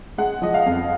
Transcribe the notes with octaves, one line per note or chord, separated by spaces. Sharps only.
G#3 F#5
F3 D#5
F5
F2